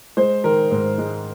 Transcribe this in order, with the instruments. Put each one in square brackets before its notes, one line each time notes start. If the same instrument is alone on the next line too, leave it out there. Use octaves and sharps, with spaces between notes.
[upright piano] G#3 C5
D#3 A#4
G#2
G#3